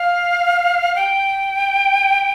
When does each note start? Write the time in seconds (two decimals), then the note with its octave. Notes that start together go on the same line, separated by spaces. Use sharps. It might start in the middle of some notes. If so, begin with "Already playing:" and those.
Already playing: F5
0.95 G5